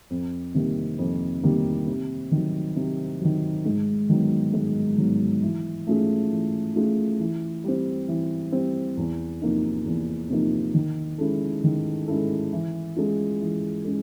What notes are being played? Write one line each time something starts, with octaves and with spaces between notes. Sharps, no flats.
F2
C3 D#3 G3 A#3
F2
C3 D#3 G3 A#3
C3
D#3 F#3
C3
D#3 F#3
G#2
D#3 F#3 B3
G#2
D#3 F#3 B3
E3
A3 C#4 F4 G#4
E3
A3 C#4 F4 G#4
E3
G3 C4
E3
G3 C4
E2
C3 F3 A#3 D#4
E2
C3 F3 A#3 D#4
D#3
G#3 C#4 E4 A4
D#3
G#3 C#4 E4 A4
E3
G#3 C#4 F4
E3
G#3 C#4